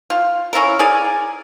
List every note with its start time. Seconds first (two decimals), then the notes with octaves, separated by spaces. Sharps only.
0.10 F4
0.53 C#4 E4 F4 A#4
0.79 G#4 A#4 D5 G#5